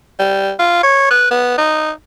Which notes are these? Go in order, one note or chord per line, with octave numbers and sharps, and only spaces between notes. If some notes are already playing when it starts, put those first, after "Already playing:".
G3
F4
C#5
B4
B3
D#4